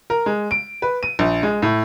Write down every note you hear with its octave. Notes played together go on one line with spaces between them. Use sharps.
A#4
G#3
D7
B4
D#7
A#1
G#3
A2